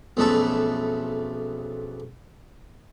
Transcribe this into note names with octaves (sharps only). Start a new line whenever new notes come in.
B1 F2 C#3 A3 A4 B4